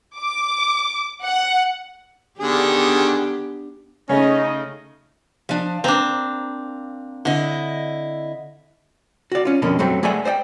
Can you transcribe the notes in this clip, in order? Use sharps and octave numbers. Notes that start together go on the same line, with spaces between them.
D6
F#5
D3 D#3 B3 D4 G4 G#4
C#3 A3 C#4 D#4 D#5
F3 D4
A#3 C4 D4 A#5
D3 E4 D#5
F#4 D5
C#4 F4
F2 B2 D3 A#3 C#4
F#2 F#3 G3 A3 C4
A3 G#4 D5 E5 F#5 G#5
C5 D5 D#5 G5